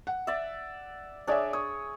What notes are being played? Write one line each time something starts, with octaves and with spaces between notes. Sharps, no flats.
F#5
D5 E5
D4 G#4 C#5 D5 E5
C#5 D#6